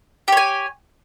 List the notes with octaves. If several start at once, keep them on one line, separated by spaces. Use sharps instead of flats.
G4 C#5 G#5